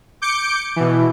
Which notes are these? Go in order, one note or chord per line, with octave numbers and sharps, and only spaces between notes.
D6 G6 C#7 D7
B2 E3